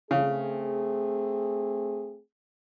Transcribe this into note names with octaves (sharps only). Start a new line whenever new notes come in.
C#3 A3 C4 G#4